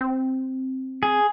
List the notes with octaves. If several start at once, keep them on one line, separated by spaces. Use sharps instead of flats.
C4
G#4